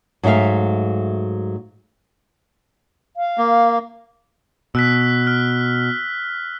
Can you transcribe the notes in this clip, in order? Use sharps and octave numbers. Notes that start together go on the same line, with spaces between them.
G#2 F#3 A3 E5 F5
F5
A#3
B2 E6 F#6 B6
F6